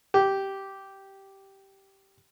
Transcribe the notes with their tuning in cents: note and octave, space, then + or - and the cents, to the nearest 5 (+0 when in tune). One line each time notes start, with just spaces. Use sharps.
G4 -10